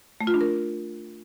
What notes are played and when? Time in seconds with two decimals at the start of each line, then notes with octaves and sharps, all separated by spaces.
0.21 A3
0.27 F4
0.34 D4
0.41 A#4